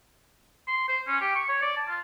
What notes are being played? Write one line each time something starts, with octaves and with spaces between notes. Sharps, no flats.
C6
C5
C#4
G4
C#6
C#5
D5
A5
F4